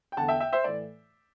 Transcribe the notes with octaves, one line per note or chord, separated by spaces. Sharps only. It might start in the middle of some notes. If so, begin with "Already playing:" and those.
G5
E2 D3 F#5 A5
E5 G5
E5 G5
C5 E5
A2 E3 D5